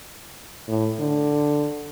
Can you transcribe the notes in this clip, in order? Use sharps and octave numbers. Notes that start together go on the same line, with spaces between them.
A2
D3